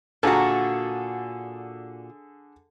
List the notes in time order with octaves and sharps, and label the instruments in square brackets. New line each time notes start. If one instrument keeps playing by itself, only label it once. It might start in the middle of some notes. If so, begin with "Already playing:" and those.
[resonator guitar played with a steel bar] A#2 F#4 [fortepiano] D3 G#4 A4